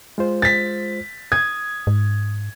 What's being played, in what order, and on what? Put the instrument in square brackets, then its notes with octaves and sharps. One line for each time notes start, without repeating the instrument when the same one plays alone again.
[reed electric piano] G#3 F4 C5
[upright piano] A6 B6
[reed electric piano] D#6 [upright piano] G#6
[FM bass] G#2